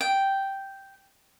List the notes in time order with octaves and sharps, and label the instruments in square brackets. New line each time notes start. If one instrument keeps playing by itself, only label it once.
[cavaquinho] G5